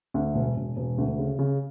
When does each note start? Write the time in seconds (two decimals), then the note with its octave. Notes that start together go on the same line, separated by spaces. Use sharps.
0.14 D2
0.34 E1
0.56 E1
0.77 E1
0.98 D2
1.18 C#3
1.39 C#3